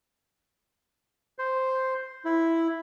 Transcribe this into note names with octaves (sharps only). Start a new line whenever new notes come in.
C5
E4